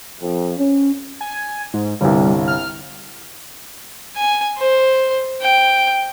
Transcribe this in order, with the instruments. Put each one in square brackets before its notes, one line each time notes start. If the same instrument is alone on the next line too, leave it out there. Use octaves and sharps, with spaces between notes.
[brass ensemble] F2
C#4
[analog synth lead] G#5
G#2
[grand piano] G1 C2 [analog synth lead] G3
[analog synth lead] F6
[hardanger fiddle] G#5
C5
G5